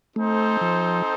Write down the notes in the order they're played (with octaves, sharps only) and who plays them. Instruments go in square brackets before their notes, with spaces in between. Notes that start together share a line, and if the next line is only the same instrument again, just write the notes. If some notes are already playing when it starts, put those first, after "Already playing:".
[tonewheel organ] A3 [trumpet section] C4 D#4 A4 C5
[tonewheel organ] F3